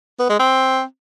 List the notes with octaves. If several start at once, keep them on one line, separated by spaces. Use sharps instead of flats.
B3
G#3
C4